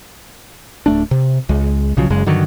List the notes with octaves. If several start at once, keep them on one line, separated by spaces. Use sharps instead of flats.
D1 A3 D4
C3
C#2 G#3
B1 C#3 F3 F#3
F#1 F#2 C#3 G#3
G2 D3 D#3 F#3